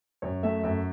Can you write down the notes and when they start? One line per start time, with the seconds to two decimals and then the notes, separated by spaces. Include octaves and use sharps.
0.22 F#2 C#5
0.43 A3 E5
0.64 F#2 E5